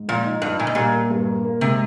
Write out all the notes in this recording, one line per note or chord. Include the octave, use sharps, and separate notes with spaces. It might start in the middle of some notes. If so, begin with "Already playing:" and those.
Already playing: G#2
A#2 F3
D#4
G2 D#4
A#2 D#4
G#2
A#2 G3
A#3
G2
A#3
A#3
G#2 C3